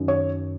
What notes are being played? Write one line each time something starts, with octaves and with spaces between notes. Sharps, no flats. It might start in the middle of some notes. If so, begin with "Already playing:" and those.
Already playing: F#2 D#3
C#5